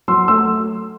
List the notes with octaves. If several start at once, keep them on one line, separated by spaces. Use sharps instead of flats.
F#3 C6 E6
A3 C6 E6